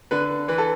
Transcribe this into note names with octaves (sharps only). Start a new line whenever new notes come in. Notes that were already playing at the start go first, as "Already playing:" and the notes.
D3 B4
E3 B4
A4